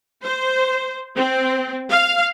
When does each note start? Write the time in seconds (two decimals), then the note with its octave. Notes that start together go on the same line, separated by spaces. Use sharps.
0.23 C5
1.16 C4
1.90 F5